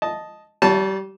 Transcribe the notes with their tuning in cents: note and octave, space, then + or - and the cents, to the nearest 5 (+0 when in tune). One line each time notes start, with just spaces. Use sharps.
D#5 +0 A5 -10
G3 -25 C#5 +20 A5 +0